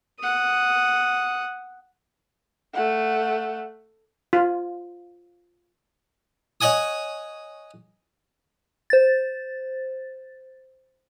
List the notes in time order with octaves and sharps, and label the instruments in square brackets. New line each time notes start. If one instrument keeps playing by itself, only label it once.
[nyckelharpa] F#5 D#6
[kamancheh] A3 F#5
[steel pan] F4
[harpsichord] C#5 D#5 F#5 G#5 D#6
[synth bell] C5 A6